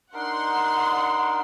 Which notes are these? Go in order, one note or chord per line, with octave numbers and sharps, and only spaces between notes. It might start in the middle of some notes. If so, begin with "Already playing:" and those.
D4 D#4 A#4 F#5 C6